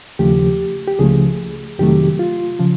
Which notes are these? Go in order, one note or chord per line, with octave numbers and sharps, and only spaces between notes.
D#2 C#3 F3 A3 G4
G4
C#2 C#3 F3 A3 G#4
F2 C3 D#3 F#3 A3 G4
F4
C#3 F3